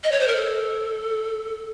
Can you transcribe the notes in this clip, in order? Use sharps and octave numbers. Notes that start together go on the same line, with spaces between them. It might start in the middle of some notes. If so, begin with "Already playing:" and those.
D#5
C#5
C5
A#4
A4